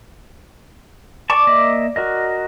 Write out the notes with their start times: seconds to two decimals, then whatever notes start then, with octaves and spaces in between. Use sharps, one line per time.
1.30 D5 A5 C#6
1.47 A#3 D#5 E5
1.96 F#4 A#4 D#5